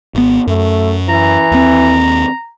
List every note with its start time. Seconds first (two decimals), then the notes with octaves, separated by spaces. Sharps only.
0.15 G#1 B3
0.47 F#2 A3
1.09 E3 A#5
1.51 D#2 C4